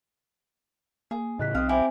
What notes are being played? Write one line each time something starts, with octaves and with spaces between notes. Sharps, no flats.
A#3 G#4
A2 C#3 D#5 F#6 B6
B1 C4 F5 D#6
E4 G4 C5 G#5